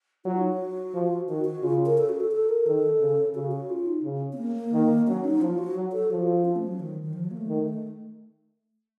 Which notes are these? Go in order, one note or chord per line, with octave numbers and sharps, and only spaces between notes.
F#3 F4
D#4
F#4
F3
D#3 F#4
F#4
C#3 F4
A#4
A4
F#4
A4
A4
A#4
D#3 A4
C#3
C#3 F#4
F#4
F4
D#4
C#3
C4
A#3
A#3
D#3
F#3 C#4
D#4
F3 F4
F#4
F#3
A4
F3 F#4
F4
C#4
A3
F#3
D#3
D#3
F3
F#3
A#3
A3
D#3